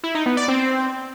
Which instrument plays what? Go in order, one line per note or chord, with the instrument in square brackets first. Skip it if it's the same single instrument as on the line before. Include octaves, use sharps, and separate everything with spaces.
[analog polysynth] E4
D#4
B3
D5
C4